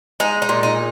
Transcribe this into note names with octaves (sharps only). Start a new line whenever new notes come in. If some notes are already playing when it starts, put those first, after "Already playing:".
G#3 D#4
D#4
A#2
D#4